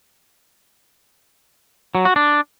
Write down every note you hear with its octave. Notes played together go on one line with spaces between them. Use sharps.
F#3
F#4
D4